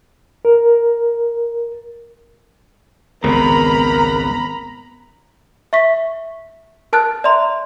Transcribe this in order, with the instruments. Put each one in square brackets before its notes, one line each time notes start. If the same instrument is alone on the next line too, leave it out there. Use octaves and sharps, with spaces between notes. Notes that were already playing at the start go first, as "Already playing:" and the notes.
[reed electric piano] A#4
[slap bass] G#1 C#2 [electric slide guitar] G#3 B3 C4 [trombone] A#4 [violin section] A#5 B5
[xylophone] E5 C#6 B6
A#4 A5 F6 F#6 A6
D5 E5 A#5 C6